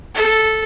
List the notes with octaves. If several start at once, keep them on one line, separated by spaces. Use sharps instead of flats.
A4